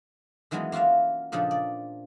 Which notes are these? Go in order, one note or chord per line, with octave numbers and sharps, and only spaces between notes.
D#3 E3 F#3 G#3 B3 C#4
A#3 F4 F#4 E5 F5
A#2 C#3 F3 D4 D#4 A4
D5